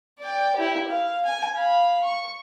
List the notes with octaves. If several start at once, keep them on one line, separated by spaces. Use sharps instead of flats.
D5 G5
E4 G4
F5
G#5
F5 B5
C#6